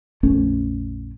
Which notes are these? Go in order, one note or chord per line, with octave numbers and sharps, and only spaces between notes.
A#1 F2 A3 C#4